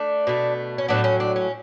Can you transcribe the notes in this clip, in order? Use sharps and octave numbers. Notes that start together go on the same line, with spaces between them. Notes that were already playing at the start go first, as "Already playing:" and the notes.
Already playing: A3 D4
B2 A3
C#4
A2 F#3 B3 D4
C#4
D4
C#4